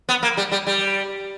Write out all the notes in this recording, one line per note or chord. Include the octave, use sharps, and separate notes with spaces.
B3
A#3
G3
G3
G3